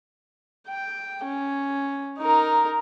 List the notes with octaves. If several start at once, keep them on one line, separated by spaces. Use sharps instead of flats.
G5
C#4
D#4 A#4